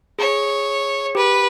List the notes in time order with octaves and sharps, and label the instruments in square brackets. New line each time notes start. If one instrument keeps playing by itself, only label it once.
[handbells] G#4 [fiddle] C#5
[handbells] G4 [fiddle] B4